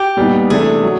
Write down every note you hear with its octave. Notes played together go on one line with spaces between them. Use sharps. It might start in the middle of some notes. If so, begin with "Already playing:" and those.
Already playing: G4
A#2 G3 B3 D#4
C3 E3 A3 D4 G#4
F#3